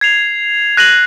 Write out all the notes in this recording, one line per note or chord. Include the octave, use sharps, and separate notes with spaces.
G#6 C7 F7
F#6 A#6 D#7 F#7